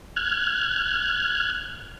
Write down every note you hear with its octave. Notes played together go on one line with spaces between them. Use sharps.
F6 F#6 G#6